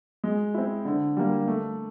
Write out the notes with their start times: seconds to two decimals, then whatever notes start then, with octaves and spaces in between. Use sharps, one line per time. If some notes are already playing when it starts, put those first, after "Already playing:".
0.24 G#3
0.54 C4 E4
0.85 D3
1.17 G3 A#3
1.48 A3